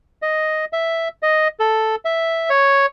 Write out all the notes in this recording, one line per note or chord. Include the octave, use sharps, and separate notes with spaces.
D#5
E5
D#5
A4
E5
C#5